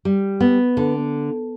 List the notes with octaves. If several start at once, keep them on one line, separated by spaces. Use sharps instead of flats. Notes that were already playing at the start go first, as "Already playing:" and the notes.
G3
B3
D3